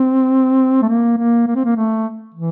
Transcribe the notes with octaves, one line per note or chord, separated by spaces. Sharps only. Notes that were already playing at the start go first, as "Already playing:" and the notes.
Already playing: C4
A3
A#3
A#3
A#3
C4
A#3
A3
E3